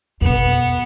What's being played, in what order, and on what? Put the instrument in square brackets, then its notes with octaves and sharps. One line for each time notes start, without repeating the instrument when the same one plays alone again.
[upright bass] F2 B2 [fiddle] B3